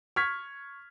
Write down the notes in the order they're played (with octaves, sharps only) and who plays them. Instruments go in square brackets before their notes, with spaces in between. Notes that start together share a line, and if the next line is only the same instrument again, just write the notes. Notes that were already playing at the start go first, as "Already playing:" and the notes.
[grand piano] C#6 F6 G#6 B6